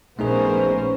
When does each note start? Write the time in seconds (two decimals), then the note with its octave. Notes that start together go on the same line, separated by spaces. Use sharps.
0.19 A#1 A3 B3 C#4 D#4 G#4 A#4 C5